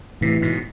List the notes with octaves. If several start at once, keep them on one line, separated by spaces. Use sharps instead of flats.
A2 C3 E3
G#2 B2